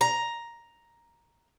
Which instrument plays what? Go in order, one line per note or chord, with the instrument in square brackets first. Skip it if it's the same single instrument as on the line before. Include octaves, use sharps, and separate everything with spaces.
[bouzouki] A#5